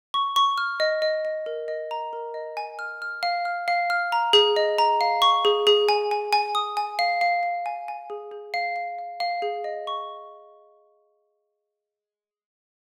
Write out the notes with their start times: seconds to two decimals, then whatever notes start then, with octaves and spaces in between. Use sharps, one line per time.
0.14 C#6
0.36 C#6
0.58 F6
0.80 D#5
1.02 D#5
1.25 D#5
1.46 A#4
1.68 D#5
1.91 A#5
2.13 A#4
2.34 D#5
2.57 G#5
2.79 F6
3.02 F6
3.23 F5
3.45 F6
3.68 F5
3.90 F6
4.12 A#5
4.33 G#4
4.56 D#5
4.78 A#5
5.01 F5
5.22 C#6
5.45 G#4
5.67 G#4
5.89 G#5
6.11 G#5
6.33 G#5
6.55 D#6
6.77 G#5
6.99 F5
7.21 F5
7.43 F5
7.66 G#5
7.88 G#5
8.10 G#4
8.31 G#4
8.54 F5
8.76 F5
8.99 F5
9.20 F5
9.42 G#4
9.64 D#5
9.87 C#6